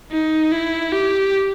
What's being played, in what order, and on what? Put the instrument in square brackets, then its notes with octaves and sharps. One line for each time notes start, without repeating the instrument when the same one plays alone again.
[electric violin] D#4
E4
G4